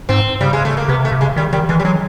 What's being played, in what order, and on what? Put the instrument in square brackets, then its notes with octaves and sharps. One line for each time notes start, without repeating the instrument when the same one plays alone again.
[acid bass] G#2 [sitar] C4
[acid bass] C#3 [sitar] G3
[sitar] G#3
A3
A#3
[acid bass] C3 [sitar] B3
[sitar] A3
[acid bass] C3
[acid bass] C#3 [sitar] G#3
[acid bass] D#3 [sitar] G3
[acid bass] D#3 [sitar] G3
[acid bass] E3 [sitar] G#3
[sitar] G3
[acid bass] F#3 [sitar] G#3